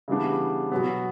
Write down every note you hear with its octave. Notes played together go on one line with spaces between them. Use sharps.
C#3 E3 G3 B3 D4
B2 F#3 B3